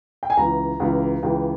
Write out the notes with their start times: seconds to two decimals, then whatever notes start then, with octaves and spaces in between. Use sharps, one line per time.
0.23 G5
0.30 G#5
0.37 C#2 C#3 E3 A#5
0.80 C#2 C#3 E3
1.23 C#2 C#3 E3 G5